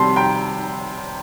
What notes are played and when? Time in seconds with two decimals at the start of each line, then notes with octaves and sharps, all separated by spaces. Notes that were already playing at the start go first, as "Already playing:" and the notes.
Already playing: C3 G3 C4 A5 C6
0.16 G5 A#5